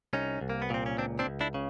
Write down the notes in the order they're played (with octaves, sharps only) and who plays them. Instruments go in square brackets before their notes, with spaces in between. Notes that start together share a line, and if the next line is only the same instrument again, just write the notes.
[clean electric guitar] C2 C#4 D#4
C2
A#3
B3
A#2 C4
C#4
C#2 C4 D4
C4 D4
C#2
D4 E4
C#3